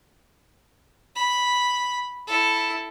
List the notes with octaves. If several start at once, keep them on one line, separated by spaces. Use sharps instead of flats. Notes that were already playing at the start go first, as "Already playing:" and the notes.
B5
E4 A4